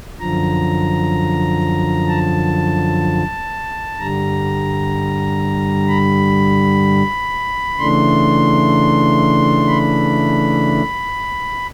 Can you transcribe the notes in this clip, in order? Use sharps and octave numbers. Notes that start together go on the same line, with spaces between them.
F#2 D3 F3 A#5
A5
G2 D3 G3 A#5
B5
C#3 E3 A3 D4 C6
B5